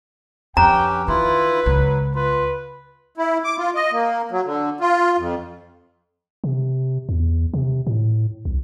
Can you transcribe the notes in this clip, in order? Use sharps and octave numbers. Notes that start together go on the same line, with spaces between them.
F2 C#4 G4 B4 G5 A#5
D#3 E4 F4 B4
C#2 F#3
F4 B4
E4
D6
F4
D#5
A#3
F#3
D3
F4
F2
C3
E2
C3
A2
C2